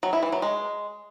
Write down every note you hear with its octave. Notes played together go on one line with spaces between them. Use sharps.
F#3
E4
E3
F#3
G#3